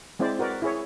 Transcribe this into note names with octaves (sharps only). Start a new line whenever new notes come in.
G#3 C4 E4 C5 D5
F#4 A#4 B4 D5
E4 G#4 C#5